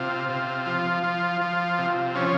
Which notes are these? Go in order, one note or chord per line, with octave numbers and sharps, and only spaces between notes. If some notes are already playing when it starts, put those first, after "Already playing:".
Already playing: C3 F4
C3
F3
F3
F3
C3
F3 C#4